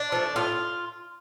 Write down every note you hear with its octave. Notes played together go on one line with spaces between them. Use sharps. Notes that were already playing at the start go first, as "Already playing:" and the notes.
Already playing: D4
F3 A3
A2 F4